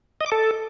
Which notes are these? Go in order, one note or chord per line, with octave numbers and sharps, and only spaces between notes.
D#5
D6
A4